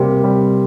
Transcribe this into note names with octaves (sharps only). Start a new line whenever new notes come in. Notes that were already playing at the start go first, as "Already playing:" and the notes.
Already playing: C3 G3 A#3
G3